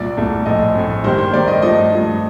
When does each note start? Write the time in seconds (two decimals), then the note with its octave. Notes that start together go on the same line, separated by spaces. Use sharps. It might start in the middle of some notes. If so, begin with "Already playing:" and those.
Already playing: C2 A#2 D5
0.17 C2 A#2 A3
0.46 A#1 A2 A3 D#5
0.75 A#1 A2 A3
1.04 G2 D#3 G3 A#3 C5
1.19 C5
1.33 G2 D#3 G3 A#3 D5
1.48 D#5
1.62 G2 F3 A3 D#5
1.91 G2 F3 A3